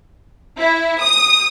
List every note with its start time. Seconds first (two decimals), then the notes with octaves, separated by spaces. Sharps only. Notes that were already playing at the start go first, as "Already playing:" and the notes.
0.58 E4
1.01 D#6